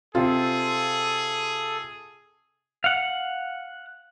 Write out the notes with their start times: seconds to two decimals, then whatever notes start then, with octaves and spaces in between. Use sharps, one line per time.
0.15 C3 C4 F4 G#4 A4
2.84 F5 F#5